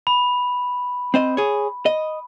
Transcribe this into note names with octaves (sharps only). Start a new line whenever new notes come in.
B5
C4 C5 D#5
G#4 C#5
D#5